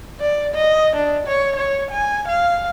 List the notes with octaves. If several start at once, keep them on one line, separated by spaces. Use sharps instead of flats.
D5
D#5
D4
C#5
C#5
G#5
F5